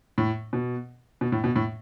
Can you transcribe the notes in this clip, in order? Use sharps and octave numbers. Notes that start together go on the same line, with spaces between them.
A2
B2
B2
A2
B2
A2